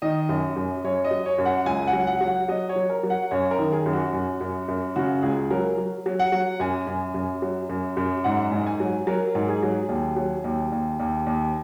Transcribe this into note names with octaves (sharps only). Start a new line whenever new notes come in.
D#3 D#5
F#2
F#2
F#2 C#5
D#5
F#3
C#5
F#2
F#5
C#2 G#5
F#5
F#3
F#5
F#3
F#5
F#3 D#5
C#5
F#3
A#4
F#3
F#5
F#2 C#5
A#4
D#3
G#4
F#2
F#4
F#2
F#2
F#2
C#3 F#4
C#2 G#4
F#3 A#4
F#3
F#3
F#5
F#3
F#2 G#5
F#2
F#2
F#3
F#2
F#2
G#2 F#5
G#2
G#5
F#3
F#3 A#4
G#2
G#4
F#3
D#2
F#3
D#2
D#2
D#2
D#2